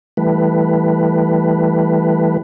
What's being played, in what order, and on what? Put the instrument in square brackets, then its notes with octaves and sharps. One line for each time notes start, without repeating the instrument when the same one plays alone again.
[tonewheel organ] E3 G3 A3 B4